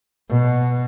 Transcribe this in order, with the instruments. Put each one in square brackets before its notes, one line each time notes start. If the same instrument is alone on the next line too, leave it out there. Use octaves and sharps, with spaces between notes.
[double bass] B2